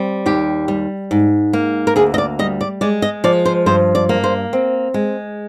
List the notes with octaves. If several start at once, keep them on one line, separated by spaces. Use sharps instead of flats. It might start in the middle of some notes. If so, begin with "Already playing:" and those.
Already playing: G3 C4
D#2 G4
G3
G#2
A#3
A#4
D2 G#4
D#5
D5
G3 D#5
D5
G#3 D5
D#5
F3 D5
C5
G2 C5
D5
A#3
C5
C4
G#3